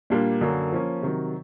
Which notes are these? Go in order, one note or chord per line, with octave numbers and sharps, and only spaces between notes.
A#2 G3 A#3 D4 F4
F#2 D3 F#3 A#3
F3 A#3 C#4
C3 D#3 F#3